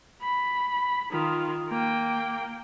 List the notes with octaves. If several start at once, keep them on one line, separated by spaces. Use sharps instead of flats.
B5
D#3 F4
A#3 G5